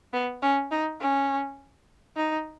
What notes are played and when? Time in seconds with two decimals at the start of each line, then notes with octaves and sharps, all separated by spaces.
0.13 B3
0.42 C#4
0.71 D#4
1.01 C#4
2.16 D#4